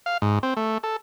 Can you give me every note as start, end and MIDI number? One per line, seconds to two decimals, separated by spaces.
0.06 0.18 77
0.22 0.39 44
0.43 0.54 60
0.57 0.78 57
0.83 0.96 69